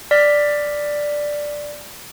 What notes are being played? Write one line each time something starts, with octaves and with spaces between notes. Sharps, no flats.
D5 F6 B6